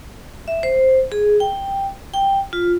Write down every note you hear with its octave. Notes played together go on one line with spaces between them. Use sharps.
E5
C5
G#4
G5
G5
F4